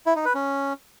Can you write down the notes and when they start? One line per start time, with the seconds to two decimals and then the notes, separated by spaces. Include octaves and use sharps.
0.06 E4
0.16 D#4
0.25 B4
0.35 C#4